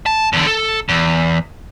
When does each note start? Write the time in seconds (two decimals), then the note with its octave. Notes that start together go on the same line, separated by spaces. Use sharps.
0.06 A5
0.33 E2 D3
0.47 A4
0.89 E2